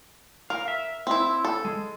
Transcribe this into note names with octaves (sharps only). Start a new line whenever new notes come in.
A#4 F5
E5
C4 E4
A4
G#3